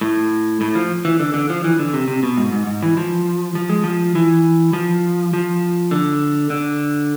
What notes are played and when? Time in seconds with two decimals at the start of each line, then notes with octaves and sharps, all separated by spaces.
0.01 A2
0.61 A2
0.75 F3
1.05 E3
1.20 D3
1.34 D3
1.50 F3
1.64 E3
1.79 D3
1.93 C3
2.08 C3
2.23 B2
2.37 G#2
2.52 G#2
2.67 G#2
2.83 E3
2.97 F3
3.55 F3
3.69 G#3
3.84 F3
4.15 E3
4.73 F3
5.33 F3
5.91 D3
6.50 D3